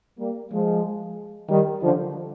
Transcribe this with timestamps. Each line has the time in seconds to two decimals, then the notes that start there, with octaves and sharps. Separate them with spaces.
0.19 G3 A#3
0.51 F3 G#3
1.49 D#3 G3
1.82 D3 F3